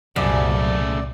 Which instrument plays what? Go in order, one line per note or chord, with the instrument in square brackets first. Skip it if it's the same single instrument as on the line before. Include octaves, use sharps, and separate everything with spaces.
[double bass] C2 A#2 [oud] F#2 [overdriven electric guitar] C#3 A3 [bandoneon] D5